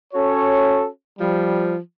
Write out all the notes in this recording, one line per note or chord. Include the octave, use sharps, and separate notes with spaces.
C#4 F#4 A4 C#5
F3 G3